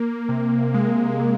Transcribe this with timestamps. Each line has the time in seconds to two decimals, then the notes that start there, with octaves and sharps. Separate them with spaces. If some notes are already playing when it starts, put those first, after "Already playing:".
Already playing: A#3
0.29 C3
0.74 G#3
1.20 C3